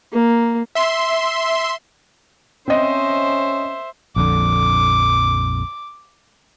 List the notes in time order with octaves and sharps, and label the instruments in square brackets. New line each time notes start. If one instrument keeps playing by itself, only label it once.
[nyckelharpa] A#3
[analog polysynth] E5 C6
[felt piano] C4 D#5 [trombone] C#4 [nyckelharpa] C5 E5
[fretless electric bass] A#1 F2 D3 [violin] D6